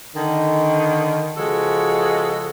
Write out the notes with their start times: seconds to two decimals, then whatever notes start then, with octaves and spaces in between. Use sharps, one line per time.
0.15 D3 D#3
1.37 C#3 F3 G#3 F#4 A4